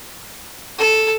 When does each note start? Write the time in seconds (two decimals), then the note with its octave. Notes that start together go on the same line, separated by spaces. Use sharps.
0.79 A4